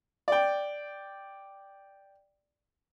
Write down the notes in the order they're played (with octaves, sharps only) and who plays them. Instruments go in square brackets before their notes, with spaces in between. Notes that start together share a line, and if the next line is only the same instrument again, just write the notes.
[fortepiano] D5 G5